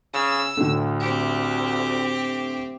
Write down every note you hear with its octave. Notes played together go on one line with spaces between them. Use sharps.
C#3 E6
D2 A2 D3
C4 G4